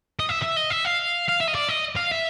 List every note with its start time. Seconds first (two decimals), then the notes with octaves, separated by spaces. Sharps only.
0.19 D#5
0.29 E5
0.42 E5
0.57 D#5
0.71 E5
0.85 F5
1.29 F5
1.41 E5
1.48 D#5
1.55 D5
1.69 D#5
1.96 F5
2.11 E5